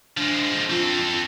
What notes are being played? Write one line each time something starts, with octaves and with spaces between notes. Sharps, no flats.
F3 G#3 D4
C4 F4 A4